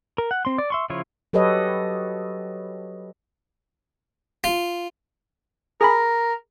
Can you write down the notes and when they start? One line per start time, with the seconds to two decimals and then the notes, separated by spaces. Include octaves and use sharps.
0.18 A#4
0.31 F#5
0.45 C4 C6
0.58 D5
0.70 E5 C6 C#6
0.90 C#3 F3 E4 F4 C#5
1.33 F#3 G4 A4 B4 C#5 D#5
4.44 F4
5.81 G#4 A#4 G#5 B5